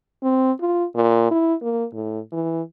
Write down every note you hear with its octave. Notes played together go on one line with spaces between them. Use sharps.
C4
F4
A#2
E4
A#3
A2
E3